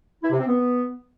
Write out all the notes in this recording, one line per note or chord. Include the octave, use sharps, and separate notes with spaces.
E4
C3
C4
B3